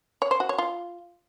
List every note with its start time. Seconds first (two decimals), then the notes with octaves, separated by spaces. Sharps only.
0.22 C#5
0.31 C5
0.40 F#4
0.49 C#5
0.58 F4